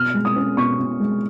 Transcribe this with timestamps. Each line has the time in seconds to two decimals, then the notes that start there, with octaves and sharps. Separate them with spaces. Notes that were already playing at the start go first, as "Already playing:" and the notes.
Already playing: B2 F6
0.14 G#3
0.25 D#6
0.36 C#4
0.57 B2 C#6
0.79 B2
1.00 G#3